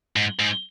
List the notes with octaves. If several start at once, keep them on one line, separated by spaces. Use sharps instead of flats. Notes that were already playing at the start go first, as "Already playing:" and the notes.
G#2
G#2